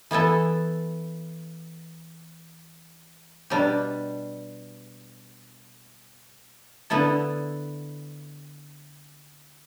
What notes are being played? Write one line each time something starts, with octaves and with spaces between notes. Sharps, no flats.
E3 B3 E4 A4
B2 G3 D4 G4
D3 B3 E4 A4